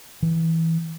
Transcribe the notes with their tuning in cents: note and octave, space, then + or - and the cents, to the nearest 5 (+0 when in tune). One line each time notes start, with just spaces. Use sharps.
E3 -15